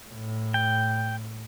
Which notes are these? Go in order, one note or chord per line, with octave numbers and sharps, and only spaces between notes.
A2
G5